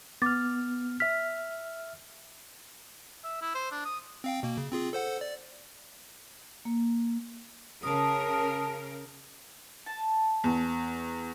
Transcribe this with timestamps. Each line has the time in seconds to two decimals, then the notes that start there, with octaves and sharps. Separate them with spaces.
0.22 B3 D6 F6 A6
1.00 E5 F6 B6
3.24 E5
3.41 E4
3.55 C5
3.71 D4
3.85 D#6
4.24 C4 F5 G5
4.43 B2 A#3
4.57 C#3
4.72 C4 F4 G#4
4.93 A4 C5 F#5
5.21 D5
6.65 A#3
7.83 C#3 A#4 A5 D#6
9.86 A5
10.44 E2